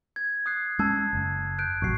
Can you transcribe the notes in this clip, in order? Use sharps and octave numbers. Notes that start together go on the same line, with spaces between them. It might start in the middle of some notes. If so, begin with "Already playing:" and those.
G#6
D#6 F#6 C7
G#3 C#4 A5 E6 G#6
F#1
F#6 G6 D7
A1 C3 F#3 C#6 C7